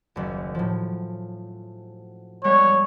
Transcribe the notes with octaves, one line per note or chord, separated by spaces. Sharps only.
F#1 D#2
A2 F3
G3 G#3 B3 C#5